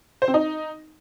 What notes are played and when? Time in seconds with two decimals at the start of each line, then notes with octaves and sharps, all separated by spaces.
0.22 C5
0.28 C4
0.34 D#4